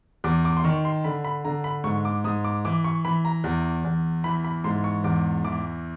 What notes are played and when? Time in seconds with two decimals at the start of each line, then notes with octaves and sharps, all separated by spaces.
0.24 E2 D6
0.45 D6
0.57 C6
0.64 D#3 C#6
0.85 C6
1.04 D3 B5
1.24 B5
1.45 D3 A#5
1.64 B5
1.84 G#2 C#6
2.05 D6
2.24 G#2 D#6
2.44 D6
2.65 E3 D6
2.84 C#6
3.05 E3 B5
3.25 A#5
3.44 E2
3.85 E2
4.24 E3 B5
4.44 B5
4.64 G#2 C6
4.84 C#6
5.04 E2 D6
5.44 E3 D6